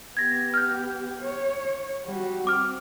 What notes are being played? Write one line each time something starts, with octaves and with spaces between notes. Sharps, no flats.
B3 G4 G#6 A#6
F6 G6
C#5
G3 F#4
C4 D6 F6